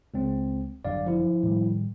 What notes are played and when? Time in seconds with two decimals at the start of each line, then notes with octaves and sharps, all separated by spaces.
0.14 C#2 C4
0.85 G1 F#2 D3 D5 F5
1.06 F3 E4
1.43 A2 D#3 G3